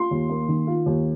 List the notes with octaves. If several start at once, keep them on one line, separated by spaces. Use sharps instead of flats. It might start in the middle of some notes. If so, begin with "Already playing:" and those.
Already playing: F4 C6
D#2
A#3
D#3
F4
D#2